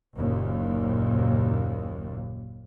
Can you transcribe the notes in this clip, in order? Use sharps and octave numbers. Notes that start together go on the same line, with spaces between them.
F#1 D#2 A#2